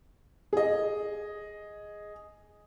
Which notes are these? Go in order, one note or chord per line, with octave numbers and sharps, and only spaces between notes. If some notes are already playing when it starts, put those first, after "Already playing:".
G#4 D#5